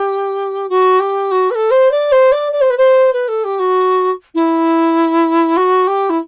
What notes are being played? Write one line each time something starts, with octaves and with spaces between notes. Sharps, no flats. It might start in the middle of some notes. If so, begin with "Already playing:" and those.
Already playing: G4
F#4
G4
F#4
B4
A4
C5
D5
C5
D5
D5
C5
B4
C5
B4
A4
G4
F#4
E4
F#4
G4
E4